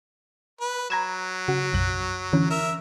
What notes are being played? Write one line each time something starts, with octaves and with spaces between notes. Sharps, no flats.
B4
F#3 A#5 G#6 E7
C#3 F#4
B1 F#2 F#6
D3 E3 C#4
A#4 E5